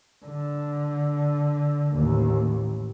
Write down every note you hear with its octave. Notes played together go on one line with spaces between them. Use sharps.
D3
A1 D#2